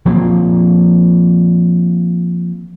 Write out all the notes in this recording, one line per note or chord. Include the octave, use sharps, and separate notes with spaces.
F3 A#3 C4